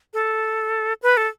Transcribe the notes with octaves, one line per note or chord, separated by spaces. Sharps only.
A4
B4
A4